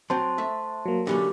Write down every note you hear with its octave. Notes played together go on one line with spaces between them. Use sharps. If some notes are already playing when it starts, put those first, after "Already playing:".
F#3 C4 C5 A5 C6
A3 E5
F#3 A#3
D3 E3 C#4 G4